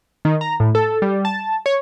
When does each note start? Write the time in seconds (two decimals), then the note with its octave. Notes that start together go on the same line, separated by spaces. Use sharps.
0.25 D#3
0.41 A#5
0.60 A2
0.75 A4
1.02 G3
1.25 A5
1.66 C#5